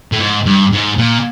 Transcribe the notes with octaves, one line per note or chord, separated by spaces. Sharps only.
A2
G#2
G2
G#2
A#2